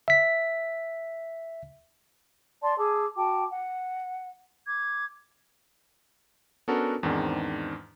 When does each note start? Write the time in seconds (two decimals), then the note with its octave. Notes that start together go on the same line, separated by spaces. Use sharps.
0.08 E5 B6
2.62 D5 A5 C6
2.78 G#4 A5 D6 E6
3.16 F#4 G5 A5 D6
3.51 F#5
4.66 D6 G#6
6.68 B3 C#4 D4 F#4 A4 A#4
7.03 E2 G#2 D#3 C4 D4